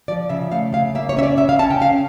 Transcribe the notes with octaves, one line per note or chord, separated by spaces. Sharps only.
F3 D5
C#3 E5
A3 F5
C#3 F5
A#3 E5
C#5
C#4 E5
D5
C#3 E5
F5
C#4 A5
G5
C#3 F5